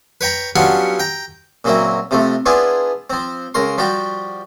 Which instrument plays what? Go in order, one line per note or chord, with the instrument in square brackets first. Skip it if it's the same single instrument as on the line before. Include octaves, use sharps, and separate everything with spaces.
[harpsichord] B4 C#5 G5 A#5 B5
F#3 G3 B3 C#4 D4 F4
G5 A#5
A#2 C#3 F#3 A#3 C4 E4
C3 F3 A3
B3 D4 E4 F4 G#4
F3 C4
C#2 C#3 A#4 C6
F3 G3 F#4 G4